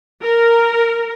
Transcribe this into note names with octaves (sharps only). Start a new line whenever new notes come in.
A#4